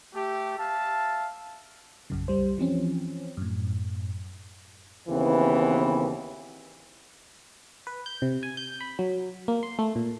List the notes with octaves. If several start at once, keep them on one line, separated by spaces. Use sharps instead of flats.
A3 G4
E5 F5 A5
A#1 F#2 C#3
C2 G3 C5
E3 F3 C4 C#4
F#2 A2
D#2 C#3 E3 B3 C4
B4
G6
C3
G#5
G6
B5
F#3
A#3
C6
A3
A#2